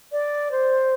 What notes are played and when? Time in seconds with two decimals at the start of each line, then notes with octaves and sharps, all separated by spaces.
0.12 D5
0.51 C5